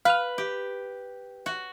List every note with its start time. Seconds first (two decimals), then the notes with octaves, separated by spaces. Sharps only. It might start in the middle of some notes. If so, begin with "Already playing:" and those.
0.05 B4 F5 F6
0.38 G4
1.46 F#4